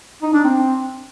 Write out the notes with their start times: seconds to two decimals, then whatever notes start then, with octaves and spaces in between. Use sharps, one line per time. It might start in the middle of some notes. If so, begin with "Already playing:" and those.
0.23 D#4
0.33 D4
0.44 C4